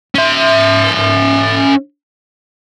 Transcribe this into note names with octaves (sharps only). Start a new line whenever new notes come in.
C#4 E5